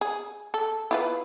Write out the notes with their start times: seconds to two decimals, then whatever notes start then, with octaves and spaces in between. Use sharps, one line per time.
0.01 G#4
0.54 A4
0.91 E4 F4 B4